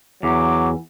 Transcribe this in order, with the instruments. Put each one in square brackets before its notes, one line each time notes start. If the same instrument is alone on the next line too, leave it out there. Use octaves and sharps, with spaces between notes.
[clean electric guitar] E2 [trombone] F#3 [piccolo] D6